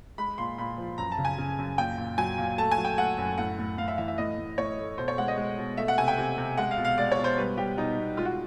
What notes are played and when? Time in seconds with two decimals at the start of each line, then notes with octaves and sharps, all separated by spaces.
0.18 G#3 B5
0.38 A#2 C6
0.58 A#2 B5
0.78 F3
0.98 F#2 A#5
1.12 A5
1.18 C#3
1.25 G#5
1.38 C#3
1.58 F#2
1.78 A#2 G5
1.98 A#2
2.18 F#3 G#5
2.38 A#2
2.58 A3 A5
2.72 G#5
2.78 F#3
2.85 G5
2.98 A3 F#5
3.18 F#2
3.38 A2 F#5
3.58 A2
3.78 A2 F5
3.88 E5
3.98 E3 E5
4.08 E5
4.18 A2 D#5
4.38 A2
4.58 A2 C#5
4.78 A3
4.98 B2 C5
5.08 C#5
5.18 G#3 F#5
5.28 D#5
5.38 G#3
5.58 B2
5.77 A3 E5
5.88 F#5
5.98 C3 G#5
6.08 G5
6.18 C3
6.38 C3
6.57 G#3 F#5
6.71 F5
6.78 B2
6.85 F5
6.98 G#3 D5
7.12 C#5
7.18 B2
7.24 C5
7.38 G3 B4
7.58 G3 G4
7.77 B2 D#4
7.98 B2
8.17 G#3 F4
8.25 F#4